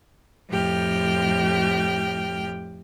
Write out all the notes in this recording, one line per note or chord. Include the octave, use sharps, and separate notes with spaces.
F2 A2 G4 G5 F6